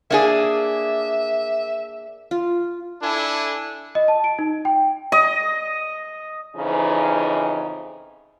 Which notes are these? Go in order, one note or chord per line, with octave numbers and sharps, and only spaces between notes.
A#3 D4 G#4 E5
F4
D4 E4 A4 G#5
D#5
A5
D7
D#4
G5
D#5
F2 C#3 E3 D#4